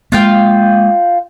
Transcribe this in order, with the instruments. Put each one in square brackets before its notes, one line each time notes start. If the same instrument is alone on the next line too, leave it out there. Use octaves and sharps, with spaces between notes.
[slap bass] G#3 A#3 [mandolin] F4 F5 G5